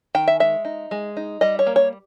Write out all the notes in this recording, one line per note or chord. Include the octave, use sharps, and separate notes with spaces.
D#3 G5
E5
G#3 E5
D#4
G#3
D#4
G3 D#5
C#5
A#3
C#5